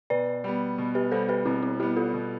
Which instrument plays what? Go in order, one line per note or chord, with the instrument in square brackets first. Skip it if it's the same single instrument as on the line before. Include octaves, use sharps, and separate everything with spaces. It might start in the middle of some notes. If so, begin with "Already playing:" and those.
[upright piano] B2 [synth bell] B4 D5
[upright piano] G3 B3
B2
[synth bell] G4 B4
[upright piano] G3 B3 [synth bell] A4 C5
[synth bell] G4 B4
[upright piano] B2 [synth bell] C4 E4
[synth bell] C4 E4
[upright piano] G3 B3 [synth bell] E4 G4
[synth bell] F4 A4
[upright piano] B2